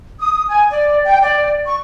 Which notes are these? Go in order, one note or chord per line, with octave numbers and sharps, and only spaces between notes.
D#6
G#5
D5
G5
D5
C#6